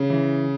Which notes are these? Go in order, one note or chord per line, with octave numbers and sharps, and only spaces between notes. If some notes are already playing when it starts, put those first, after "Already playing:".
Already playing: C#3 C#4
E3